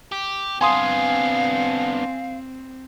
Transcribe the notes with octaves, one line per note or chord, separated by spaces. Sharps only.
G4
B3 C4 D4 F5 G#5 C6 D#6